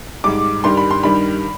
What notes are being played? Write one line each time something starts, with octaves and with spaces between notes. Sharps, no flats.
G#2 G3 D6
G2 D#3 G3 C6
B5
C6
G2 D#3 G3 B5